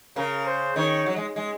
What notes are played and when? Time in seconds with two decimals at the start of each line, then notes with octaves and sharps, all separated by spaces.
0.16 C#3 A#4
0.46 C5
0.76 D#3 C#5
1.06 F#3
1.16 G#3
1.36 G#3